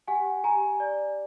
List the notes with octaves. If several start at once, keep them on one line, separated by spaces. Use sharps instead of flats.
G4 F#5 G#5
G4 G#5 A#5
D5